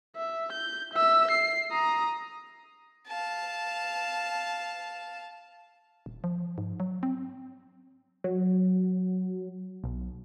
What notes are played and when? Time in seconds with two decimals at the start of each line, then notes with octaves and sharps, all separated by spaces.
0.16 E5
0.52 G6
0.94 E5 E6
1.31 C7
1.72 A#5 D#6
3.07 F5 A5
6.06 D#1
6.24 F3
6.58 G#2
6.80 F#3
7.03 C4
8.24 F#3
9.84 B1